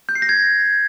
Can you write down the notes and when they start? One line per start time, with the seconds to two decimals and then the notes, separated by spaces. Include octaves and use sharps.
0.09 G6
0.15 C7
0.22 A#6
0.29 G#6